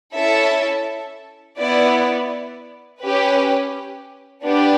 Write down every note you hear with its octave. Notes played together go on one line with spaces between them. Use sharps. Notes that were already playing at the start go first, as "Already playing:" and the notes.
C#4 E4 A4 E5 A5
B3 E4 B4 D5
C#4 G4 B4
B3 D4 G4 B4